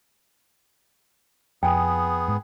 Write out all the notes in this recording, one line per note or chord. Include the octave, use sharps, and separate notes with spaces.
F2 B3 G#4 G5 G#5
G#2